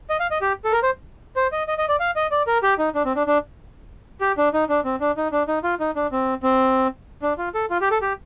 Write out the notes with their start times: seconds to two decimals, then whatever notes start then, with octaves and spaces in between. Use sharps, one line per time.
0.10 D#5
0.20 F5
0.31 D#5
0.42 G4
0.65 A4
0.72 A#4
0.83 C5
1.36 C5
1.52 D#5
1.68 D#5
1.78 D#5
1.89 D5
2.00 F5
2.16 D#5
2.31 D5
2.47 A#4
2.63 G4
2.78 D#4
2.95 D4
3.05 C4
3.16 D4
3.27 D4
4.21 G4
4.38 D4
4.53 D#4
4.69 D4
4.85 C4
5.01 D4
5.17 D#4
5.32 D4
5.48 D#4
5.64 F4
5.80 D#4
5.96 D4
6.12 C4
6.43 C4
7.22 D4
7.38 F4
7.54 A4
7.70 F4
7.81 G4
7.91 A4
8.02 G4